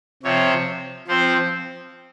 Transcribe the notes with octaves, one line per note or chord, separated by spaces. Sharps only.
C3 F3 C4 C#5
F3 C4 C5